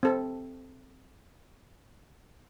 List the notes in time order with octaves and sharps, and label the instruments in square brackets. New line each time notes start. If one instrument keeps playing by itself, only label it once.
[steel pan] C4 A4